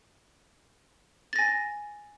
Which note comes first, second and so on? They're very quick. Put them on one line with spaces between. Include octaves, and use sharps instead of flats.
A6 A#6 G#5